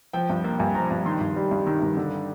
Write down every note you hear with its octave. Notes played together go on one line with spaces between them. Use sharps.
F3 G5
G2
A#3
G2 G#5
F3 A#5
G2
D#3 C6
G2
G3
G2
D#3
G2
D3